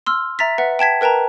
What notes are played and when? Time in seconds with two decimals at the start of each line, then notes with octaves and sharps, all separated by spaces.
0.06 C6 E6 F6
0.39 E5 A#5 A6 B6
0.58 B4 E5 F#5
0.79 G5 A5 G#6 B6
1.01 A#4 B4 G5 A5 A#5